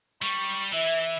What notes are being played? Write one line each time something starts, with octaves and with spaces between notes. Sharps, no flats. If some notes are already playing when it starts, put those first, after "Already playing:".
G3 C#6
E3 E5